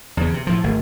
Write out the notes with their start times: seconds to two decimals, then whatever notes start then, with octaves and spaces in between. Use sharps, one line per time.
0.17 E2 C#3
0.34 C3
0.47 A2 F3
0.64 G#1 A3